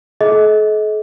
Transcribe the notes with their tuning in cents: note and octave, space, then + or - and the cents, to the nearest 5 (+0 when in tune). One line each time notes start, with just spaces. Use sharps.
A4 -45 D#5 +30